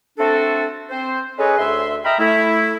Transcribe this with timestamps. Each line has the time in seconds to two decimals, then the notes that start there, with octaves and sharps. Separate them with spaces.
0.18 A3 C4 D4 F#4 A4
0.90 C4 C5
1.39 C#4 G#4 A4 B4 C#5 D#5
1.58 D2 E5 C6
2.05 D#5 E5 G5 A#5 B5 F6
2.18 A3 E4